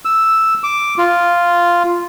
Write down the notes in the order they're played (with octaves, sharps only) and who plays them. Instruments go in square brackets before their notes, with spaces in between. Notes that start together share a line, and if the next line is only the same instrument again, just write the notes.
[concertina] E6
D6
F4